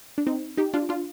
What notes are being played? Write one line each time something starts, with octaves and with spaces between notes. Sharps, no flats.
D4
C4 D#4
D#4 G4
D4 F4
D4 F4